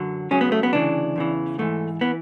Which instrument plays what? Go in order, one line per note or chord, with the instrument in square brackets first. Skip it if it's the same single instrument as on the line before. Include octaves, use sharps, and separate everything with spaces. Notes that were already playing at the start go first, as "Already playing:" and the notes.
Already playing: [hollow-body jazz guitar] F#2 D3 F#3
C#2 C#3 F#3 C#4
B3
A3
B3
D2 C#3 E3 D4
E2 C#3 E3
G#2 E3 A3
E3 B3